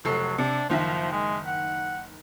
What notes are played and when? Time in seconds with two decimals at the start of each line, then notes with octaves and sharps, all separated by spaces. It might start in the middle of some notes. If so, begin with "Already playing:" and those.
0.05 F1 F#3 A4 C7
0.38 C3 D4
0.70 F#1 D#3 F3 E5
1.13 G#3
1.47 F#5